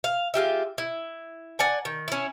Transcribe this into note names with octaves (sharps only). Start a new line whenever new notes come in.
F5
G#3 F4 G4 E5
E4
D5 F#5 G#5
D#3
C#4 E4